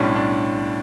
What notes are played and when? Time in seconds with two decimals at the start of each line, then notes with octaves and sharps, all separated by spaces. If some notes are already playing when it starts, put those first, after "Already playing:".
Already playing: B1 A2 G3 C#4 D4
0.15 D4